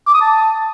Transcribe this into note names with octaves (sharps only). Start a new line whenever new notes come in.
D6
D#6
A5